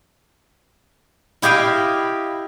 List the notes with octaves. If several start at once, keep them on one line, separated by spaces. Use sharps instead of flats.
E4 G4 D#5 F5 G5